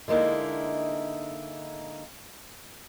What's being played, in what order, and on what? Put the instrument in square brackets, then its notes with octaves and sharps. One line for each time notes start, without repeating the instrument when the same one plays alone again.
[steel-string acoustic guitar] D3 G#3 A#3 D#4 E4